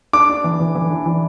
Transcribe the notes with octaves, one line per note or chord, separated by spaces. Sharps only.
D4 D6
D4
E3
E3
E3
D4
E3